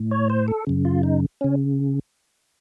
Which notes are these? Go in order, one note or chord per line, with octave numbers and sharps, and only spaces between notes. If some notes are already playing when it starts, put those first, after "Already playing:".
Already playing: A2
C#5
C5
A4
F#2 C#3
F4
D#4
C#3 C#4